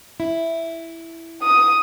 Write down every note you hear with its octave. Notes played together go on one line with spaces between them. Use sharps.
E4
D#6